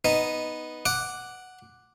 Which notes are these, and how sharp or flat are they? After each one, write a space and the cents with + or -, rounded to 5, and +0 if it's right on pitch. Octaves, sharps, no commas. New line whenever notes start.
B3 +0 D#4 +0
F#5 +0 D6 +0